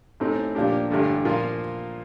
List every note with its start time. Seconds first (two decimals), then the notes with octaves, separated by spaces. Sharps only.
0.20 A1 A2 A3 C4 D#4
0.55 A#2 F3 A#3 D4 G4
0.91 A1 G2 D3
1.25 A#2 F3 A#3 F4